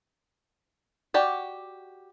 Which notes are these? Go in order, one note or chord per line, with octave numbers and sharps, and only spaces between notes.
F#4 G4 D5